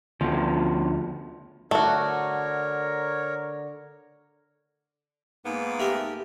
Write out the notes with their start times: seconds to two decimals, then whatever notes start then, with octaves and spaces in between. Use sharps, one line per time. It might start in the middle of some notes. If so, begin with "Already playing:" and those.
0.21 D2 B2 F3
1.71 D3 A3 F#4 A#4 C#5
5.45 G#2 A#3 B3
5.79 A3 G4 A#4